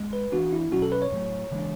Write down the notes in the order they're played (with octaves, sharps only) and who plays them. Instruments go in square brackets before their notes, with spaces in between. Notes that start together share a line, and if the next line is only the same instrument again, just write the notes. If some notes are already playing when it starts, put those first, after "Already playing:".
Already playing: [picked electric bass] G#3
[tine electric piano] B4
[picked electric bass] E3 B3 D4 [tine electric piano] F#4
[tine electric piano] E4
[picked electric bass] B2 F#3 C#4 [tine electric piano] F#4
[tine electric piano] A4
B4
C#5
[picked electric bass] A2 F#3 A3
C#3 E3 G#3 D4